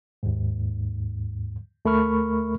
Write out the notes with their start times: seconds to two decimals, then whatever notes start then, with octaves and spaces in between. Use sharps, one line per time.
0.23 D#2 G#2
1.85 D2 A3 A#4 B5 C#6 F6